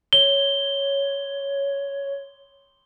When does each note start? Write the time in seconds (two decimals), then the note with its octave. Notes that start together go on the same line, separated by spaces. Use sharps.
0.13 C#5 G7